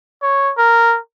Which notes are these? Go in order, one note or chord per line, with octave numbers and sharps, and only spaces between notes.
C#5
A#4